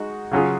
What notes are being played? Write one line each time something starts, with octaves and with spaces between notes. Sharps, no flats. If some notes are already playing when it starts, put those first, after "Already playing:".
Already playing: G#3 D#4 F#4
C#3 F#3 C#4 F4 G#4